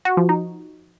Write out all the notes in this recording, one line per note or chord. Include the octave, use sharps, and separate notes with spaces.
F#4
F3
D#4